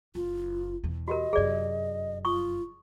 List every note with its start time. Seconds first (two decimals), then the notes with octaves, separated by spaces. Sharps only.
0.15 F#1 F4
0.84 E2 B2
1.08 F#4 G4 A#4 D#5
1.33 F1 F#2 G#4 D5
2.25 F4 C#6 D#6